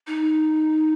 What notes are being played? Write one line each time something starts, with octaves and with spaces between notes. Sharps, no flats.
D#4